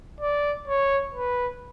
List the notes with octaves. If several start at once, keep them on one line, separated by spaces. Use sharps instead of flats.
D5
C#5
B4